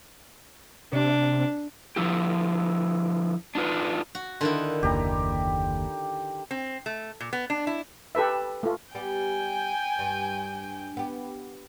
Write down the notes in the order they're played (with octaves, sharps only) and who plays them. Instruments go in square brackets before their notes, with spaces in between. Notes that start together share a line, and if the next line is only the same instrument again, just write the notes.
[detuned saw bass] C3 [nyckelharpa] D4
[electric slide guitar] D3 F3 E4 G4
D4 D#4 F4 B4
[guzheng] F#4
[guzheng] D3 D#3 E4 [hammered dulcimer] C6
[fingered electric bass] F#1 D#2 [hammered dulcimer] G4 A#5
[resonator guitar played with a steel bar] C4
A3
A#2
B3
D4
E4
[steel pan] G4 A4 B4 E5
A3 F4
[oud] G3 B3 G4 [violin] G5 G#5
[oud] G2
B3 G4